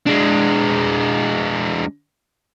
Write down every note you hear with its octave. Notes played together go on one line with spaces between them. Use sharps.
G#3 D4